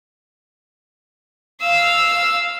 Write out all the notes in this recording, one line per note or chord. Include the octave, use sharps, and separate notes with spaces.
F5 E6